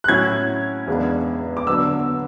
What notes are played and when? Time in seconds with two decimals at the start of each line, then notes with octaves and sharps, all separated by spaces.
0.04 F#6
0.08 A2 F#3 C#4 E4 G#6
0.87 E2 C#3 G#3 B3 D4
1.57 D6
1.67 D3 F#3 B3 D4 E6